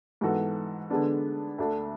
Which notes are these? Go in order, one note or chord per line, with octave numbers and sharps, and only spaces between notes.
G#2 E3 B3 F#4 A4
D3 G#3 B3 D4
D2 D3 A3 D4 F#4